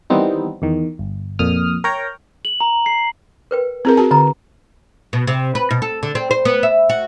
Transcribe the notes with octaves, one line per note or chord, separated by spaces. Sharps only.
D#3 E3 G3 B3 C4 D#4
E2 D#3
G1
F2 A#2 D#6 F6
A#4 C#5 G5 A#5
F#7
A#5
C7
A#4 B4 G5
C4 E4 G#4 A#4
F#4 G#4 A5
D3 B4 A#5
B2
C3
B4
B2
A4
D3
C4
C5
B3
E5
F#4